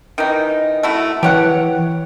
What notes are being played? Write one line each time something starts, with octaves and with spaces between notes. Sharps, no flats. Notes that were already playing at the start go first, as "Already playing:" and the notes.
D#3 E3 D#4
A3 E4 F#4
E3 G4 C#5 F#5